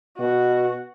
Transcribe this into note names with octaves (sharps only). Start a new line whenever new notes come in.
B2 F#4